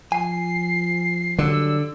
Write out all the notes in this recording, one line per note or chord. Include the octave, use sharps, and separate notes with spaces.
F3 G#5 C7
D3 F#3 G3 E6